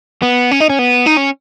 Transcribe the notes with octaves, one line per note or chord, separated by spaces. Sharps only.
B3
C#4
D#4
C#4
B3
D#4
C#4